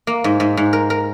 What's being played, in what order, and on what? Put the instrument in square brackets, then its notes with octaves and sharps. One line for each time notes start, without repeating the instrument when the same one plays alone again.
[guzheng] A#3
G#2
G#2
G#2
A#4
A#4